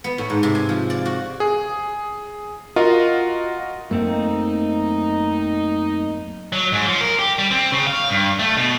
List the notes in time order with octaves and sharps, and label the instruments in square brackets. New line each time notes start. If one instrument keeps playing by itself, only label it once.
[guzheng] B3
A2
G#2
C3
G#5
F3
D5
F#4
[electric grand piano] G#4
F4 F#4 A#4 D#5
[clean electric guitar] F#2 A3 C4 [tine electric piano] A#3 [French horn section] D#4
[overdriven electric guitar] F#3
G#2
F3
A#4
G4
G3
C4
C#3
F5
G2
A3
B2